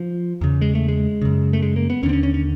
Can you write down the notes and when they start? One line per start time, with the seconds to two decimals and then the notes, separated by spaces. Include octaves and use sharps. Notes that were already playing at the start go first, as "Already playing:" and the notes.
Already playing: F3
0.41 E2 C#3
0.61 G#3
0.75 A3
0.88 G#3
1.22 F#2 C#3
1.53 A3
1.62 G#3
1.76 A#3
1.90 B3
2.03 D#2 C#4
2.06 D3 C4
2.13 C#4
2.23 C#4
2.34 C#4